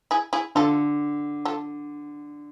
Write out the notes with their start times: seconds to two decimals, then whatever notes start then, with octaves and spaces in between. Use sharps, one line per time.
0.11 E4 G#4
0.33 E4 G#4
0.55 D3 F4 A4
1.45 F4 A4